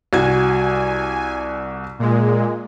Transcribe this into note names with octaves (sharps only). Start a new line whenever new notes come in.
C2 F#4 G#5 G#6
A#2 G#3